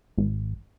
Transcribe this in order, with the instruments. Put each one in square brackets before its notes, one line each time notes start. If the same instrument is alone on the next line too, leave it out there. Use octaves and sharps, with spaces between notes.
[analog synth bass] G#1